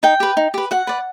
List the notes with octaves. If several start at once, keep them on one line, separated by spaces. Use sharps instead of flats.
D#4 G5
G4 B4
D#4
G4 B4
F#4 F#5
B4 D5